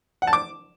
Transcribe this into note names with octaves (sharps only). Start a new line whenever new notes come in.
F#5
A5
D6